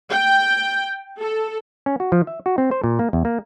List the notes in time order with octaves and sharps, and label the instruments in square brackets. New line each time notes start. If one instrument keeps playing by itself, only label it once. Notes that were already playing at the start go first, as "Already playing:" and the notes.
[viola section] G5
A4
[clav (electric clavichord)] C#4
F#4
F3
E5
F#4
C4
C5
A#2
A#3
E2
A#3